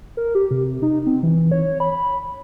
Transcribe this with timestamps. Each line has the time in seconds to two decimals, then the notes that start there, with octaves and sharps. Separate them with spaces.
0.17 A#4
0.35 G4
0.51 C3
0.82 D#4
1.06 C4
1.23 E3
1.51 C#5
1.80 B5